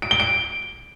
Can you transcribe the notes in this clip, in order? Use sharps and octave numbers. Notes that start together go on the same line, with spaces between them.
D7
G7
D7